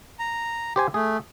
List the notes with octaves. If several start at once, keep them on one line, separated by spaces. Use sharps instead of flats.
A#5
G4 C5 G#5
A3 G#4